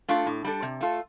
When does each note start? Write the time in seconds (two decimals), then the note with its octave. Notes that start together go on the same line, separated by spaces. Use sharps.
0.08 A3 D4 F4 A4
0.26 A2
0.44 G3 D4 A4
0.62 C3
0.81 A3 F4 A4